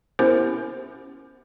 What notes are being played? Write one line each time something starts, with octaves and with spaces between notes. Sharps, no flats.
B3 C#4 E4 G4 A#4 C5